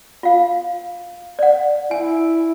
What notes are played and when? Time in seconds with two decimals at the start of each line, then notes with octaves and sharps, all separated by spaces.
0.23 F4 F5
1.39 D5 F#5
1.91 E4 G#5